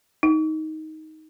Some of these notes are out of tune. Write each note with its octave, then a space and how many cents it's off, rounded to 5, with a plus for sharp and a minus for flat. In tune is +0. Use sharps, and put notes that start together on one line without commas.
D#4 +10